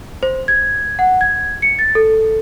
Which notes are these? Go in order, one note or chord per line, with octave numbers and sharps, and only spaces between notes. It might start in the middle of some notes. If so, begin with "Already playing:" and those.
C5
G#6
F#5
G#6
C#7
A6
A4